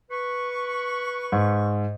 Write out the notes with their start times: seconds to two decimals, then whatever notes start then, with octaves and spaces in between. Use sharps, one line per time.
0.11 B4 C#6
1.32 G#2